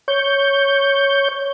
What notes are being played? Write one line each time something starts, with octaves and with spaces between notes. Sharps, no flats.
C#5 G6